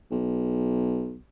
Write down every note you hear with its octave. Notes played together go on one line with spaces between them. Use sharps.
B1